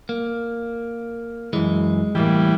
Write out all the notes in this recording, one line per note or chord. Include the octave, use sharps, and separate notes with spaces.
A#3
F#2 E3 G#3
E2 A2 E3 G3 A#3